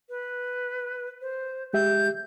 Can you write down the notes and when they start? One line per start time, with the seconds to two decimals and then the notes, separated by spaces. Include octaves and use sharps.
0.09 B4
1.21 C5
1.73 G#3 G4 E5 G6